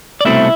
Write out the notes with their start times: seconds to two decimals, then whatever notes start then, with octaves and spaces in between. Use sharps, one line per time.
0.21 D5
0.25 C2 B2 A3 C4 E4 E5